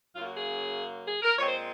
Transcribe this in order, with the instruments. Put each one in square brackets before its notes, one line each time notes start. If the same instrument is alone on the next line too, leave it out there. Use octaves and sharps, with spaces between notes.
[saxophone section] F#2 C#3 F#3 A#3 F4
F#4
G#4
G#4
A#4
A#2 G#3 C4 C#5
C5